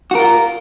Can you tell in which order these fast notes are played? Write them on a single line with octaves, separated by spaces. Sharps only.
F#4 A#4 F4